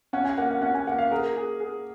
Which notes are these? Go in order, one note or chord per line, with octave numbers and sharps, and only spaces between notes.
C#4 F#5
G#5
A#3 F#5
F#5
C#4 F#5
G#5
A#3 F#5
F5
G#4 A#4
G#4
G#4